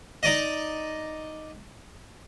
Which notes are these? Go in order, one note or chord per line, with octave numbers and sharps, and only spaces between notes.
D#4 D5 D#5